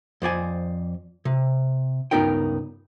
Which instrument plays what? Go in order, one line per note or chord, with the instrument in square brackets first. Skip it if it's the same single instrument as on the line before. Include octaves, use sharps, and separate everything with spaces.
[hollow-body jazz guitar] F2 C5 D5 G#5
C3
C#2 G2 B3 D#4 A#4 G5